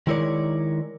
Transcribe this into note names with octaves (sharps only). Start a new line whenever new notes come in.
D#3 G#3 E4 A#4 C#5 D5